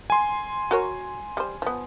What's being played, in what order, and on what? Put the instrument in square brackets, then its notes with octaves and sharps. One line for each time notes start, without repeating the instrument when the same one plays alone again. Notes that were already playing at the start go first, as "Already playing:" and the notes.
[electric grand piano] G#5 C6
[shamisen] F#4 A#4 C#5
G3 C5
F3 B3